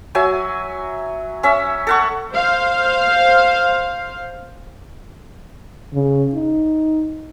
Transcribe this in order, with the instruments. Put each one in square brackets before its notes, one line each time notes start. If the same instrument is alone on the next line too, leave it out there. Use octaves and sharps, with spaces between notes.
[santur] F#3 E5 G#5
C#4 E5
A4 F#5 C#6
[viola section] C5 F5
[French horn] C#3
D#4